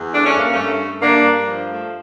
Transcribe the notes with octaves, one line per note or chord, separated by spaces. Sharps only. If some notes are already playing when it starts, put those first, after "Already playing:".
Already playing: E2
A3 D4
C#4
G2 A#3
G2 A3 C#4
A3
G2 A#3 D4
G2
F3
A3